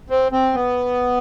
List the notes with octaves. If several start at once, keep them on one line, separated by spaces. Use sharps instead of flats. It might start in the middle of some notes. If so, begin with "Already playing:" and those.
C4
C4
B3